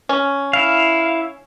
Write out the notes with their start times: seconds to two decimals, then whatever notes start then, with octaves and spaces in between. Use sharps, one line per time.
0.09 C#4
0.53 E4 F5